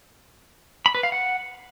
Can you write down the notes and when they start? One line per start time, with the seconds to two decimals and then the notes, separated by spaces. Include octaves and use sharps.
0.86 B5
0.95 B4
1.03 F5
1.12 F#5